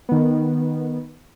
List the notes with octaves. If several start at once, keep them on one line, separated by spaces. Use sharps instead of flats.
D#3 B3